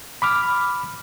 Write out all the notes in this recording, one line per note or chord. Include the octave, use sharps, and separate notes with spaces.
B5 D6 F6